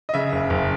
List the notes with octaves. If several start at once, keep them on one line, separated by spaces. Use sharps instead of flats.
D#5
C#3 E5
F#1
F#1